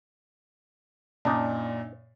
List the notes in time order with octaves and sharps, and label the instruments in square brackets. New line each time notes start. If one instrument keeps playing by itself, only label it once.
[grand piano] F#2 A#2 [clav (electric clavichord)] D4 D#4